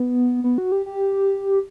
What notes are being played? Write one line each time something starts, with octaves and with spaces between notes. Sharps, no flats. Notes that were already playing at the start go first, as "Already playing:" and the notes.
Already playing: B3
B3
F#4
G4
G4